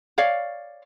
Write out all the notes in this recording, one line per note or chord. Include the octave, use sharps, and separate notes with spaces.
C#5 D5 F5